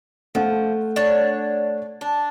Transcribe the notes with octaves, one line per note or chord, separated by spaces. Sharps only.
F3 A3 F#5
D4 C#5
D4